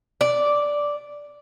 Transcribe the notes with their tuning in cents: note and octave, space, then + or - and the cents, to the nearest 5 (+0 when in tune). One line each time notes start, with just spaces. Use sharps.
D5 -5